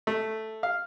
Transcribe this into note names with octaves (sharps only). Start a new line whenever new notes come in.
A3
F5